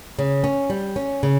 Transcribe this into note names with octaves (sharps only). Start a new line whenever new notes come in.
C#3
C#4
G3
C#4
C#3